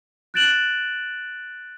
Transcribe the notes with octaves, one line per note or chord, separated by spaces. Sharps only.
F#6 G6 A6 D7 E7 F#7